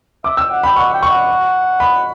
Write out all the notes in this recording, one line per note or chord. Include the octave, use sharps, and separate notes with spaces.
E5 D6
G5 E6
F#5
G5 B5
F#5 C#6
G5
C#6
F#5
B5